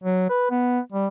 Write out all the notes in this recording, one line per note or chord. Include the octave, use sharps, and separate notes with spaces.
F#3
B4
B3
G3